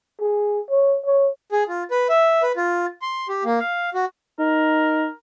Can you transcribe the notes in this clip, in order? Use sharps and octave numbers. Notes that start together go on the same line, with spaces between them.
G#4
C#5
C#5
G#4
F4
B4
E5
B4
F4
C6
G4
A#3
F5
F#4
D#4 A#4